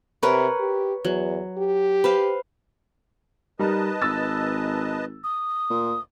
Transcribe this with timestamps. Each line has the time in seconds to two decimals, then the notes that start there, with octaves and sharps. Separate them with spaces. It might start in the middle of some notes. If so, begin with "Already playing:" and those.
0.23 C3 A#4 B4 C#5
0.60 G4
1.05 E2 F#3
1.57 G4
2.04 B4 C5 F5
3.59 G3 D#4 A#4 B4 D#5 A5
4.02 G#1 E6 A6
5.24 D#6
5.70 D2 A#2